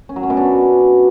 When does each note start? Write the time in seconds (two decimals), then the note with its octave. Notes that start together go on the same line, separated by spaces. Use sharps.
0.09 C#4
0.16 F#3
0.23 C#4
0.30 B2
0.37 D4